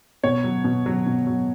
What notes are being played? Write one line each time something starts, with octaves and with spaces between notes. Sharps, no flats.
B2 C#5
F#3
B2
F#3
B2
F#3